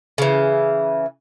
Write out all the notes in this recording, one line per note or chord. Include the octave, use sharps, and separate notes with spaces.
C#3 E3